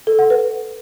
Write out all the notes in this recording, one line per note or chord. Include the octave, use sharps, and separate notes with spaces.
A4
F#5
B4